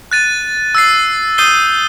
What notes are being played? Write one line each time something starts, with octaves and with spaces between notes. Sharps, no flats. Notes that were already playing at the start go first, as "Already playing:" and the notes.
F#6 A6 D#7
E6 A6 C7
D#6 G6 C7 D#7 G7